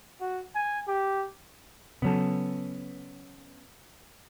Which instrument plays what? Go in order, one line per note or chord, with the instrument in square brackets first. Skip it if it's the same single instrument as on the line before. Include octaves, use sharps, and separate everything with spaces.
[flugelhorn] F#4
G#5
G4
[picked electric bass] C#3 F#3 [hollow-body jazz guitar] B3 C#4 A4